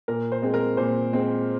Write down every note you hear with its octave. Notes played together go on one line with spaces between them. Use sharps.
A#2 A#4
C5
G#3 C4
A#4
A#2 C5
G#3 C4